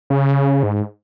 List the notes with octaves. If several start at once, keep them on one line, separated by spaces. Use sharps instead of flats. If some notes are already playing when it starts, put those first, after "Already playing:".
C#3
G#2